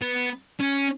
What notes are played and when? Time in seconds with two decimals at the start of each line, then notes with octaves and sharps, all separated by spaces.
0.02 B3
0.60 C#4